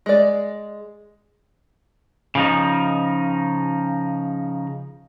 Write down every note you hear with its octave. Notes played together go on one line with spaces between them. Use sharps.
G#3 D5
C#3 F3 D#4